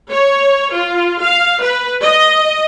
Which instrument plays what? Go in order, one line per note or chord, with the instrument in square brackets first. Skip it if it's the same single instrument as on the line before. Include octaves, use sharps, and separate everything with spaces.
[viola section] C#5
F4
F5
B4
D#5